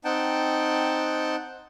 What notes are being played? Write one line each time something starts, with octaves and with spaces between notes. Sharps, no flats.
C4 D#4 F#5 G5 A5